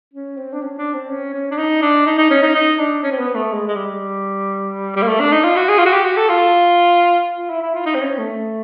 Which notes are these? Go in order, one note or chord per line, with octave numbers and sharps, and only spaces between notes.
C#4
C4
D4
C#4
D4
C4
C#4
C#4
D4
D#4
D4
D#4
D#4
C#4
D#4
D#4
D4
C#4
C4
B3
A3
G#3
G#3
G3
G3
A#3
A3
D4
D#4
F4
F#4
G#4
F4
F#4
G4
F#4
A4
F4
F4
E4
E4
F4
D#4
C4
C#4
A3